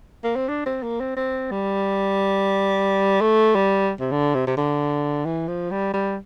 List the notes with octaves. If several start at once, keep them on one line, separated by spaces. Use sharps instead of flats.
A#3
C4
D4
C4
A#3
C4
C4
G3
A3
G3
C3
D3
C3
C3
D3
E3
F3
G3
G3